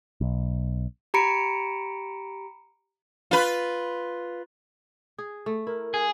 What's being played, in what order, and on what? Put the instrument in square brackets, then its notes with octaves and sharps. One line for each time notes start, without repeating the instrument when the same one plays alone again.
[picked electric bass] B1
[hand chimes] G4 A#5 B5 C#7 D7
[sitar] F4 B4
[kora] G#4
A3
[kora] E4 [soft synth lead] A#4
[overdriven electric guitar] G#4